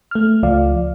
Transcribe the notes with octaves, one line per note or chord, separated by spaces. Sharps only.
A3 F6
C#2 F3 D5 F5